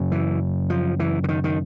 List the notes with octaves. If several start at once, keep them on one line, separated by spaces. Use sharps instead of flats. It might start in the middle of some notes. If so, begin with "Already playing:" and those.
Already playing: F#2 C#3
E3
F3
E3
D3
D#3
D#3